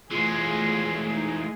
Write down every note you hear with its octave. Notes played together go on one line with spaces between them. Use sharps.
E3 G#3 A3 F4 G#4
D#4